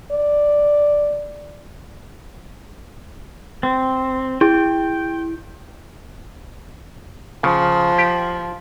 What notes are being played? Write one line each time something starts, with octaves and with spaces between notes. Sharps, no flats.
D5
C4
E4 G5
C#3 F3
G4